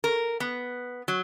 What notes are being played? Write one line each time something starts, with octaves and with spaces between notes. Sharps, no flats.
A#4
B3
F#3